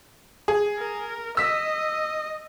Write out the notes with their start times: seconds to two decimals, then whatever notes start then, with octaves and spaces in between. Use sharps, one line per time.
0.48 G#4
0.78 A#4
1.37 D#5 E6 B6